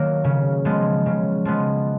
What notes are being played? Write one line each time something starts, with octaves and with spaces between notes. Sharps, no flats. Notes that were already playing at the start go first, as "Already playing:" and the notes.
Already playing: D#3 F#3 A#3
C#3
F3 G#3 B3
C#3
F3 G#3 B3